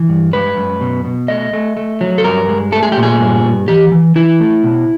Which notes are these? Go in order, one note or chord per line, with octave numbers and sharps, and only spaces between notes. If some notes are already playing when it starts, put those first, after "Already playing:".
Already playing: E3
G2
G#3 B4
F#2
B2
B2
A3 D#5
A3
A3
F#3
A4
G2 A#4
G#3
A3 A4
G#4
G4
A#2
G#4
G2
G2
E3 G4
E3
E3 E4
A3
B2